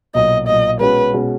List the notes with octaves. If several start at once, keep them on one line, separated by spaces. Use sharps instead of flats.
B1 A#2 F#3 D#5
B1 A#2 F#3 D#5
B2 G#3 C#4 F#4 B4
B2 G#3 C#4 F#4